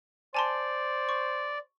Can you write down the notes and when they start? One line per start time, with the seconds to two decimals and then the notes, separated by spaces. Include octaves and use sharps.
0.34 C5 D5 G#5 A5 C6
1.09 C#6